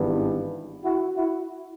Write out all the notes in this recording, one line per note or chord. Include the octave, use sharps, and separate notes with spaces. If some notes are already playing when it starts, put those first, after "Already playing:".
Already playing: G#1 G2 E3 G3 B3
E4 F#4
E4 F#4